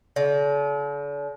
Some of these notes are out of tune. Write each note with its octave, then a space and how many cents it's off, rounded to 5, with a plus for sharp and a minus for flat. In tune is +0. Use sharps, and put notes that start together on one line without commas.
D3 -45